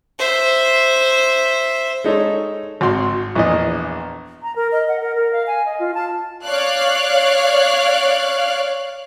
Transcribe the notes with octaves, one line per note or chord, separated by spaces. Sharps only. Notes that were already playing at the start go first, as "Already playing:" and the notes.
C5 E5
G#3 D#4 A4 C#5
G#1 F#4 C6
A#1 E2 E3 D#5
A#5
A#4
D#5
F#5
A#4
A#4
F5
G#5
D#5
F4
A5
C#5 D5 F5 F#6